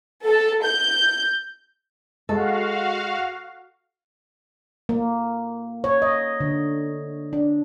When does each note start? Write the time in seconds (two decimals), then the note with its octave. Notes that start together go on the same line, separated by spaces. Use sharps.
0.25 A4
0.65 G6
2.29 G#3 F#4 A4 F5
4.89 A#3
5.84 C#5
6.02 D#5
6.40 D3
7.33 D4